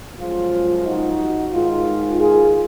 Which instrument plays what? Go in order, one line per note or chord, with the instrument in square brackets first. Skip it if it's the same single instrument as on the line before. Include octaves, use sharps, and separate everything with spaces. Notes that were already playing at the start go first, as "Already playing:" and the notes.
[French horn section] F#2 F3 G#3 F4
D#4 F#4
G#2 D#3 G#3 D#4 F4
F4 G#4